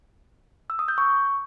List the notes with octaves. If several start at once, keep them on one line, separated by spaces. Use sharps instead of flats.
E6
D#6
G6
C#6